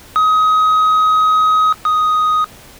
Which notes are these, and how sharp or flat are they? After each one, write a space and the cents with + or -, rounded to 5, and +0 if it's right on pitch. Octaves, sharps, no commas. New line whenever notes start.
D#6 +25
D#6 +5